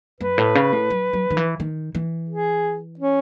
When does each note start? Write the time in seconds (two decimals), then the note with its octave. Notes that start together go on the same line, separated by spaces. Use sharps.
0.20 F#2 B4
0.38 A2
0.55 C#3
0.73 A2
0.90 F#3
1.13 F#3
1.30 D#3
1.37 E3
1.60 D#3
1.95 E3
2.29 G#4
2.99 C#4